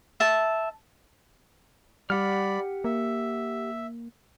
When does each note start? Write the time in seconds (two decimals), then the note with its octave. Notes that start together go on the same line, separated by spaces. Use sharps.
0.20 E5 A5
2.10 G3 G4 D5 F#5 B5 F6
2.84 A#3 E5